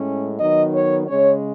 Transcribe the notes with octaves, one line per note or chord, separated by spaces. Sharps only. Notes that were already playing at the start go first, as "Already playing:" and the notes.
Already playing: A2 G#3 C#4
D#3 F#3 B3 D#4 D#5
C#5
C#3 G#3 C#4 C#5